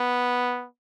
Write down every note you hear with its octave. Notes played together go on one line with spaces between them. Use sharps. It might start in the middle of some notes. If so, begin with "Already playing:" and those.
Already playing: B3